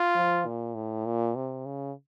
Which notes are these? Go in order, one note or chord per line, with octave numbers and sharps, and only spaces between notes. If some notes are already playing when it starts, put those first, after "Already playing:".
Already playing: F4
F3
A#2
A2
A#2
C3
C#3